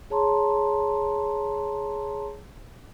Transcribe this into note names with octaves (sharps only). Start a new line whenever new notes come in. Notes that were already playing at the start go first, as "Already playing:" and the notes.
G#4 C#5 A5 A#5 C6